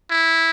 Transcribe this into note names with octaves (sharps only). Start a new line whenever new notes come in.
E4